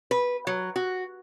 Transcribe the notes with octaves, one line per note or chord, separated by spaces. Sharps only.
B4
F#3
F#4